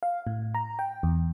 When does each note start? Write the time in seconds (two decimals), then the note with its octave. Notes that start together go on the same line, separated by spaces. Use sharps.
0.03 F5
0.27 A2
0.55 A#5
0.79 G5
1.03 E2